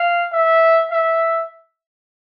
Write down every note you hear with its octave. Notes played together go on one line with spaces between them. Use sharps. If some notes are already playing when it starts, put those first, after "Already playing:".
Already playing: F5
E5
E5